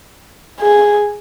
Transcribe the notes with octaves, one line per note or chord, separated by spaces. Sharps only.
G#4